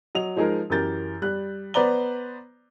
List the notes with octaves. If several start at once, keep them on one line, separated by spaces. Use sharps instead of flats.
F#3 D#5 F7
F3 G#3 D#4 G#4 A#4
F#2 E3 G4 A#4 G6 A6
G3 F#6
B3 B4 C5 D5 A#5 G7